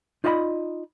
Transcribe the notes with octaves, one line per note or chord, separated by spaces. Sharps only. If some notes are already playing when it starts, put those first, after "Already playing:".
D#4 F4 D5 D#5 G#5 B5